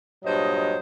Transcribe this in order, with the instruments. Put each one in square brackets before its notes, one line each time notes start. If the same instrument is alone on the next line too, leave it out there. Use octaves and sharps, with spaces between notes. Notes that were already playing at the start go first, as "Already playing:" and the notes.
[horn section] G2 A#2 F#3 C5 D#5